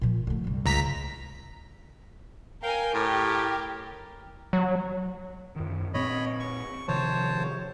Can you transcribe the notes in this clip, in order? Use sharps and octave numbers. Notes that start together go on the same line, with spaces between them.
A#2 F3
D3 A3
C2 G2
C#2 A#5 B6
A#4 F5 G5 G#5
A2 G4 A#4
F#3
F#2 D#3
A#2 B3 C4 C#5 D#5 B5
C#6
C3 D#3 F3 C5 C#5 A5